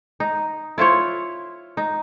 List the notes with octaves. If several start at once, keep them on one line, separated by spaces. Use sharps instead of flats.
D#4
E4 F4 C5 C#5
D#4